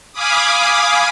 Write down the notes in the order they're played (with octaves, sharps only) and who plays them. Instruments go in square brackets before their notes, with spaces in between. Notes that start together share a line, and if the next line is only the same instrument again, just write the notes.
[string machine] F5 G#5 B5 D6 D#6